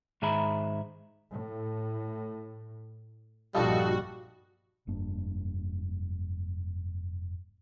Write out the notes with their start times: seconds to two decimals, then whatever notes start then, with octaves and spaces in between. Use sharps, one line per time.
0.22 G#2 D#3 G#4 E5 A#5 B5
1.31 A2
3.55 A#1 G2 G3 D#4 F4 F#4 A4
4.87 F1 G2 A#3 D4